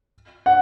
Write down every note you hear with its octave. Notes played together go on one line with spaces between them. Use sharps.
F#5